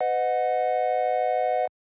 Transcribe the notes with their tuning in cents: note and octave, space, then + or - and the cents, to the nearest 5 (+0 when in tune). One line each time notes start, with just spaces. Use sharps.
B4 +40 D#5 -10 F#5 -20